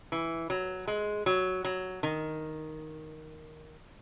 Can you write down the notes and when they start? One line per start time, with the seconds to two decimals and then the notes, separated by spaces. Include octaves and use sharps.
0.12 E3
0.50 F#3
0.87 G#3
1.26 F#3
1.65 F#3
2.03 D#3